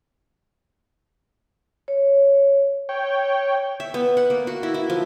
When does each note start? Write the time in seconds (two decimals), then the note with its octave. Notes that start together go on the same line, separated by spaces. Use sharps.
1.88 C#5
2.89 C#5 G5
3.80 E5
3.94 B3
4.17 F#5
4.30 A#3
4.47 F#4
4.63 E4
4.74 E4
4.90 F3